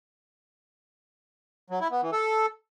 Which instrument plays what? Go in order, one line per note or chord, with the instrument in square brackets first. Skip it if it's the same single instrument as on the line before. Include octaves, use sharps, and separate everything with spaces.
[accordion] F#3
E4
B3
E3
A4